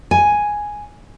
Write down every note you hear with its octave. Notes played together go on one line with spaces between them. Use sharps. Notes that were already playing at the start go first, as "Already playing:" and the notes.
G#5